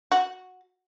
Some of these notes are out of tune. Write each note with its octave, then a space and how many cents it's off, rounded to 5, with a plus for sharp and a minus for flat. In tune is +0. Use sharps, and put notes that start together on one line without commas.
F#4 -10